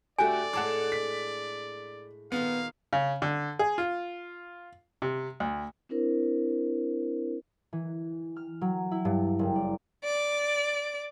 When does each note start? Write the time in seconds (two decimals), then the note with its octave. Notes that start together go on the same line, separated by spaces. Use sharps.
0.19 A3 D4 F#4 G4 A4 D5 G#5
0.53 A2 G#3 A3 F#5 A5 D6
0.92 B6
2.32 A#2 D#3 A#3 B3 F5
2.93 C#3
3.22 D3
3.59 G#4
3.78 F4
5.02 C3
5.40 D2
5.89 C4 D4 E4 A#4 C5
7.73 E3
8.36 F6
8.61 F#3
8.91 E4
9.05 G2
9.39 F#1
9.55 D5
10.04 D5